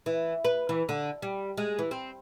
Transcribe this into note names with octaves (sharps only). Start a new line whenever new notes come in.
E3
B4
E3
D3
G3
G#3
E3
C4